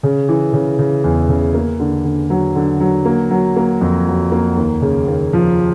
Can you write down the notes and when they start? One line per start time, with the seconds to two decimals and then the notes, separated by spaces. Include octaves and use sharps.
0.03 C#3
0.29 E3
0.53 C#3
0.79 C#3
1.04 E2
1.29 C#3
1.54 A#3
1.79 D3
2.05 D3
2.30 F#3
2.55 D3
2.80 F#3
3.05 A#3
3.31 F#3
3.56 A#3
3.81 F2
4.07 F#3
4.32 A#3
4.57 D#2
4.82 C#3
5.07 D#2
5.33 F3